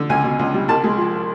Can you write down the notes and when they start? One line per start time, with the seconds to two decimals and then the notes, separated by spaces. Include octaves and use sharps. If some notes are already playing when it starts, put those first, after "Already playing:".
Already playing: D3
0.09 C#2 G#5
0.24 B2
0.39 C#2
0.54 G3
0.68 C2 A5
0.84 G#3
0.98 F3